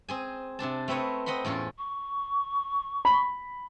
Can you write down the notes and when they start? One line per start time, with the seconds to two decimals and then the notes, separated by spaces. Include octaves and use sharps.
0.08 C4 G#4 G#5
0.59 C3 C4 D4 A5
0.88 A3 C4 B4 C#5 D#5
1.26 C4 D#5 F#5 B5 C6
1.44 E2 A2 C#4 F4
1.78 C#6
3.05 B5